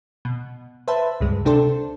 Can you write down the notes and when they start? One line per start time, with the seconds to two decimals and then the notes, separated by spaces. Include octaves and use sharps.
0.25 B2
0.88 B4 C5 E5 A5
1.20 C#2 G2 G#3
1.45 C3 D4 A4 C5